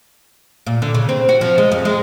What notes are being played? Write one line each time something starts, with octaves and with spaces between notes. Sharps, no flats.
A#2
D3
C#3
C4
F#4
F3
G#3
F2
G#3